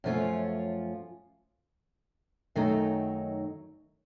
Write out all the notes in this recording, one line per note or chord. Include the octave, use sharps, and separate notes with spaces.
F#2 F3 A3 C#4 F4
F#2 D#3 F#3 A3 D#4